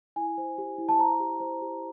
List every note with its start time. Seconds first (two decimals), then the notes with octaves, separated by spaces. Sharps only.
0.16 E4 G#5
0.38 C5
0.58 G4
0.78 E4
0.89 A5
0.99 C5 A#5
1.20 G4
1.40 C5
1.61 G4